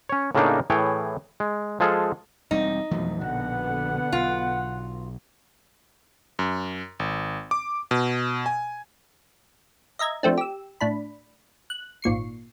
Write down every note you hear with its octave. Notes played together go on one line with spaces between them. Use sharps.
C#4 C#5
A2 C#3 A3 A#3 D4 D#4
A2 E3 G#4 C#5 G5
G#3
F3 G#3 F4 G#4 A4
E1 G3 C4 D#4
F2 B2 E3 F#3 A3
A#1 B2 D3 B3 F#5
B1 F4
F#2
G#1
D6
B2
G#5
D#5 E5 A#5 G#6
F3 A3 C4 D4
G4 E6
A2 D4 B5
F#6
G#1 A#2 C#6 C7